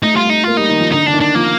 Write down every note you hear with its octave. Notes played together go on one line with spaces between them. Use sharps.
A3 D#4
G3 F4
A3 D#4
A#3 F4
G3 D#4
D#3
F3
D3 D#4
D3 D4
D#3
D4
F3 A#3